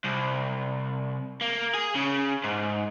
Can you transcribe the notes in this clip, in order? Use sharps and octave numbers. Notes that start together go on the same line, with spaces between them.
C2
A#3
G#4
C#3
G#2